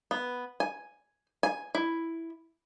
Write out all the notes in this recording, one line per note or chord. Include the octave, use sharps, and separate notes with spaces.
B3
G#5
G#5
E4